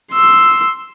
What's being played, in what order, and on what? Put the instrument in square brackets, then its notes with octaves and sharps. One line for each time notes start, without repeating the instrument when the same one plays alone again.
[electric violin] C6 E6